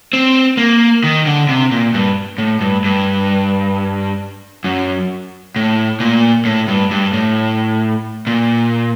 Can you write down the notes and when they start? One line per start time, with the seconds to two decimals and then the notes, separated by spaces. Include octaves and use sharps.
0.13 C4
0.57 A#3
1.04 D#3
1.26 D3
1.49 C3
1.71 A#2
1.94 G2
2.38 A2
2.61 G2
2.85 G2
4.64 F#2
5.56 A2
6.00 A#2
6.45 A2
6.68 G2
6.91 G2
7.13 A2
8.27 A#2